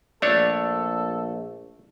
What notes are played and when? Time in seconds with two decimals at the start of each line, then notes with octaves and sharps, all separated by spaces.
0.22 A#1 A3 D4 A4 C#5 D5